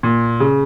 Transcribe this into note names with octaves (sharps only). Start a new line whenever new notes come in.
A#2
C#3